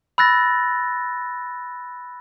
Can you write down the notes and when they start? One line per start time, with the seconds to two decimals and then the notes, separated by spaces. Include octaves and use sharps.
0.18 B5 E6 F#6 A6 A#6